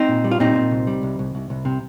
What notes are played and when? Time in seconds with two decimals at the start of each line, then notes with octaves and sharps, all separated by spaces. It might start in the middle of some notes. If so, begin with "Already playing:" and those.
Already playing: C4 D#4
0.09 A#2
0.24 G3
0.31 F4
0.40 A#2 C4 D#4
0.55 A#2
0.71 C2
0.87 G3
1.03 C2
1.19 C2
1.35 C2
1.50 C2
1.65 C3